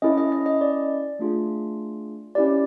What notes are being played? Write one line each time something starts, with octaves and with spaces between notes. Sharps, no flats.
C#4 E4 A4 D#5
D#5
D#5
D#5
D5
A3 D4 F4 G#4
C#4 E4 G4 D5